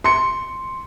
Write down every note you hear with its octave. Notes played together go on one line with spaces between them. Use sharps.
C6 C#7